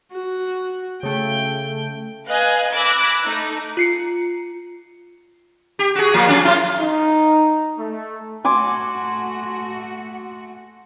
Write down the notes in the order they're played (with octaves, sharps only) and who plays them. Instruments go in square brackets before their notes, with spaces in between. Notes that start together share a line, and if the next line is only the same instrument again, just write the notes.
[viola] F#4
[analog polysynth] C#3 A3 [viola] G5
[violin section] B4 D#5 F5 G#5 F#6
B5 D6 E6 F#6 G#6 A#6
A3 D#4
[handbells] F4 C7 C#7
[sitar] G4
F#4 G#4
A#2 F3 A#3
F3 C#4 D4
A#2 E4 F4
[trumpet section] D#4
A3
[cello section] A3 F#4 [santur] G#5 C6 D6